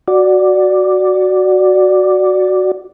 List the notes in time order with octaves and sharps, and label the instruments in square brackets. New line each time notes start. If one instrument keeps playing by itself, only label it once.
[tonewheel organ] F#4 D5